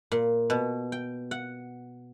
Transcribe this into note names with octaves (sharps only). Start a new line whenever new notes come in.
A#2
B2
G5
F#5